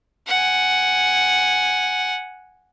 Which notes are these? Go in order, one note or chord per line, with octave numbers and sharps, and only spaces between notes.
F#5 G#5